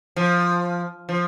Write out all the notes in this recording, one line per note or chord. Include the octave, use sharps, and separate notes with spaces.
F3
F3